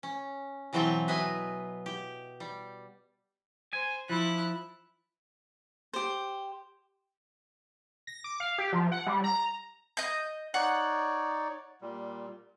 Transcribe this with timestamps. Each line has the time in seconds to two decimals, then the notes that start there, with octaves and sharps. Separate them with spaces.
0.03 C#4
0.73 B2 E3 F#3 C4 G5 A5
1.08 B2 B4 D#5 E5 G#5
1.86 G4
2.40 G3
3.73 C5 G#5
4.10 F3 E4 F#6
5.93 G4 C5
8.07 A#6
8.24 D6
8.40 F5
8.58 G4
8.73 F3
8.92 F#5
9.06 G3
9.24 A#5
9.97 D#5 G6
10.54 D#4 C#5 D5 F#5
11.81 A#2 G3